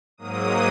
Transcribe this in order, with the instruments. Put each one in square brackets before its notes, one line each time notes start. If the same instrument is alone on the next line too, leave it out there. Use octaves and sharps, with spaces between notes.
[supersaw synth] G#2 F#3 A#3 D#6